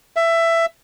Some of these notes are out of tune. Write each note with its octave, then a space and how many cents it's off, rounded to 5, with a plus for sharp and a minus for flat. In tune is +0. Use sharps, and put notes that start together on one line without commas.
E5 +15